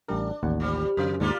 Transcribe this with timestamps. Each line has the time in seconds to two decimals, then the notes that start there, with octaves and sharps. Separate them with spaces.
0.08 A1 G3 D4 A#4
0.43 A1 D#2 F#5
0.60 F3 G3
0.97 F#2 C#3 C5 F5
1.20 D#2 G#2 G3 A#3 D4 F4